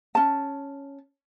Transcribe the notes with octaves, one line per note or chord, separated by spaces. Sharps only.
C#4 A5